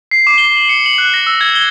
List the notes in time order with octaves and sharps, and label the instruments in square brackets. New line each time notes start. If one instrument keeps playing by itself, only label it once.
[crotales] C7
D6
G7
F#7
C#7
F#7
F#6
A#6
E6
G#6
G7